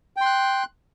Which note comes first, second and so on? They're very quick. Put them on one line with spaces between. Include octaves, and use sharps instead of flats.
G5 C6 F#6